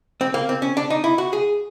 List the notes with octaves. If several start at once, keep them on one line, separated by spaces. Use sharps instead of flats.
C4
A#3
C4
C#4
D4
D#4
E4
F#4
G#4